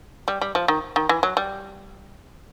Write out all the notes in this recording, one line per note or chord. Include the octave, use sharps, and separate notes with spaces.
G3
G3
F3
D#3
D#3
E3
F#3
G3